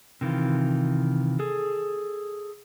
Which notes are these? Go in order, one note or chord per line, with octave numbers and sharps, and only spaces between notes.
C3 D#3 E3 F4
G#4 A4